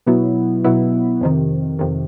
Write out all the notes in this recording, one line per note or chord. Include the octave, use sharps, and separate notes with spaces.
B2 F#3 B3 E4
B2 F#3 B3 E4
F2 C3 D#3
F2 C3 D#3